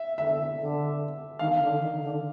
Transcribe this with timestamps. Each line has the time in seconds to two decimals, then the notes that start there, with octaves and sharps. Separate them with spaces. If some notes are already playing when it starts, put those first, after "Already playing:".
Already playing: E5
0.17 D3 E5
0.58 D3
1.39 D#3 F5
1.61 D3
1.80 D#3
2.01 D3